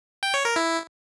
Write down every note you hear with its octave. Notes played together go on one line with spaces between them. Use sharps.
G5
C#5
A#4
E4